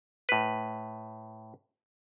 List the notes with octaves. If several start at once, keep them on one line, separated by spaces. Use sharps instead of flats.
A2 B4